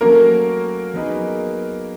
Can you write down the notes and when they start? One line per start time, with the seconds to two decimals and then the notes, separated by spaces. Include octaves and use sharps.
0.01 F#3 A3 A#3 C#4 F#4 A#4
0.94 F#3 B3 D#4 G#4 B4